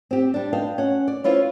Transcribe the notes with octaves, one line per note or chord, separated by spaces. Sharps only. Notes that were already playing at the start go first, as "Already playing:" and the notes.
C4 G4
G3 D4
B4 D#5 F5 G5 A5
C#4 F#5
D5
C#4 E4 F4 B4 C5